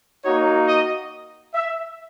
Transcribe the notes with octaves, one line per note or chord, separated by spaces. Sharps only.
A#3 D#4 F#4 C#5
D#5
E5